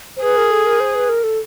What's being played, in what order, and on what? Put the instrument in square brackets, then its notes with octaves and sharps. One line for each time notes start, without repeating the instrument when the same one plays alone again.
[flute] C5
[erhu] G#4 [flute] B4
[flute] A#4
A4
A#4
C5
B4
A#4
A4